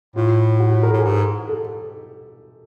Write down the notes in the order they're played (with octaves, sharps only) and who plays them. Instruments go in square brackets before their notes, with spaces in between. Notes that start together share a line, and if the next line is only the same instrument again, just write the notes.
[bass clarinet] A2 [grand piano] F4
[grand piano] F#4
A#4
A4
[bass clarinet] A2 [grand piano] G#4
[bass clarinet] G#2 [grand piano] G4
[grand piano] A4